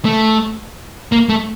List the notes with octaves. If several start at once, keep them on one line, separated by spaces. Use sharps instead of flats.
A3
A#3
A3